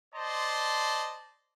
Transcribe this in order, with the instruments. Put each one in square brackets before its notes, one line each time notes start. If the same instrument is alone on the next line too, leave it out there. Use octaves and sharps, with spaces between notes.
[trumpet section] C5 D5 D#5 A5 C6